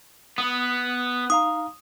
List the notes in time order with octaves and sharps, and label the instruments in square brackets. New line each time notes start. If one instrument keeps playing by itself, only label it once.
[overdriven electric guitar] B3 [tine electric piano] D#6
[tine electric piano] D#4 F5 A#5 [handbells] D#6